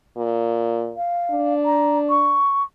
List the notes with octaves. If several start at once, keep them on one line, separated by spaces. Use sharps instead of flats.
A#2
F5
D4
A#5
C#6